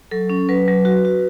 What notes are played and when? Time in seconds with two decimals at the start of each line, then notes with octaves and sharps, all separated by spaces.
0.11 F#3 A4
0.30 C#4
0.49 F#3 B4
0.68 F#3
0.85 F#4
1.05 F#4